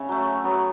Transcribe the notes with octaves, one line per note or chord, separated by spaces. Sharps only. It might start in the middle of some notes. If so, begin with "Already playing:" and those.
Already playing: C#3 E5
F#3 A3
C#3
F#3 B3